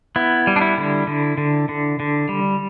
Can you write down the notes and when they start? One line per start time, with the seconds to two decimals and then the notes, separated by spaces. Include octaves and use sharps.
0.16 B3 E4
0.47 G3
0.56 D4
0.61 E4
0.78 D3
1.07 D3
1.38 D3
1.69 D3
2.00 D3
2.29 G3